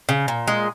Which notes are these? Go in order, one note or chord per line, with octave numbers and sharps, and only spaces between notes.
C#3
A#2
G#3